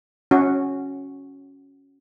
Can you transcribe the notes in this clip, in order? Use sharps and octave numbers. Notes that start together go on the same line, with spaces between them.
C#4 F#4